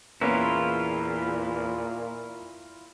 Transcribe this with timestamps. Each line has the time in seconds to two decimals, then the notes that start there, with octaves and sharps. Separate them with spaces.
0.21 E2 A#2 A#3 B3 C#4 E4 F4